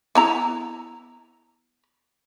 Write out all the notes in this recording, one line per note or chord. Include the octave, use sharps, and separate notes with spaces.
B3 E4 A#5